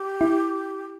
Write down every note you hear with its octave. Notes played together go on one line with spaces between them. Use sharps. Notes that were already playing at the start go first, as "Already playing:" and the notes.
Already playing: G4
E4